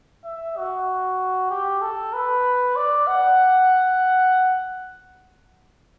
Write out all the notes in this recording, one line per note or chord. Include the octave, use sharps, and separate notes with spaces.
E5
F#4
G4
A4
B4
D5
F#5